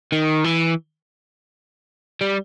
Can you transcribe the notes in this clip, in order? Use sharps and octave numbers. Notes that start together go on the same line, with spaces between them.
D#3
E3
G3